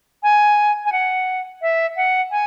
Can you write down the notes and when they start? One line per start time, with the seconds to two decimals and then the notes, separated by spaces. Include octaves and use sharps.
0.23 G#5
0.85 G#5
0.92 F#5
1.62 E5
1.97 F#5
2.31 G#5